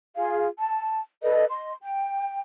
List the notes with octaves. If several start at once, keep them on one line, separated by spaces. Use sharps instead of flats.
F4 G#4 F5
A5
A4 B4 D5 D#5
D#5 C6
G5